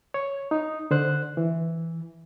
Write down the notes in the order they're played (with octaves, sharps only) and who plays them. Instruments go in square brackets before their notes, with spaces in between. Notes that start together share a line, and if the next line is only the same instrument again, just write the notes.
[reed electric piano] C#5
D#4
D3 C5 F#6
E3